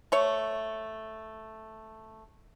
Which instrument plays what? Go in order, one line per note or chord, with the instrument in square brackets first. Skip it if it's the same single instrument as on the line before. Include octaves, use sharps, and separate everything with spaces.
[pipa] A3 C#5